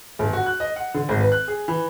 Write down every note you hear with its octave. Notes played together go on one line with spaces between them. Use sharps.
G1
F#4
F#6
D#5
F#5
D3
G#1
B4
F#6
G#4
E3